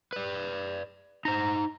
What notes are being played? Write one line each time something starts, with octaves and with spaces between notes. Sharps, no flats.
B4 D5
D#4 C5 A#5